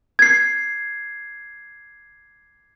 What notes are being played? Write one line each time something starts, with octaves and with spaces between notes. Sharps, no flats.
G#6 C7